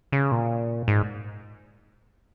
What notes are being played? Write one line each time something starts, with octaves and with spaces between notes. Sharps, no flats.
C#3
A#2
G#2